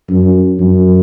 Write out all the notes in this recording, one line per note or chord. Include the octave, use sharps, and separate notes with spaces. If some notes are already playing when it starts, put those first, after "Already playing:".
F#2
F#2